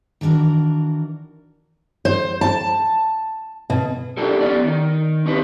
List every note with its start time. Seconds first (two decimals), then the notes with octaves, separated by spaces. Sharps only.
0.21 D#3 E3 D4 F#4 A#4
2.05 C5
2.41 A5
3.70 B2
4.17 D4 D#4 G4 A4 A#4
4.41 F2 B3 C#4 G4 D5
4.64 D#3 D#4
5.26 C4 D#4 G4 B4